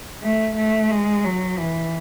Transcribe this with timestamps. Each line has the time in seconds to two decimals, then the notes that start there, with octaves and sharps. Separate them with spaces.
0.22 A3
0.56 A3
0.91 G#3
1.25 F#3
1.58 E3